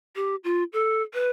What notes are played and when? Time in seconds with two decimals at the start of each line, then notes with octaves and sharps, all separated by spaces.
0.16 G4
0.44 F4
0.73 A4
1.14 B4